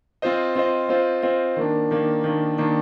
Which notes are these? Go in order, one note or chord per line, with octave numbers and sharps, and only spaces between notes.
C4 F4 C5 D#5
C4 F4 C5 D#5
C4 F4 C5 D#5
C4 F4 C5 D#5
D#3 A#3 D4
D#3 A#3 D4
D#3 A#3 D4
D#3 A#3 D4